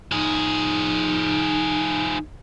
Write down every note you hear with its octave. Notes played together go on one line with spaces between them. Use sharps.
F3 D#4 G#4